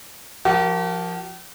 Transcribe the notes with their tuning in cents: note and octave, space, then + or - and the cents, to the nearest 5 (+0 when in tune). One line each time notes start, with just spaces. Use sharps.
F3 +0 G4 -45 A#4 +0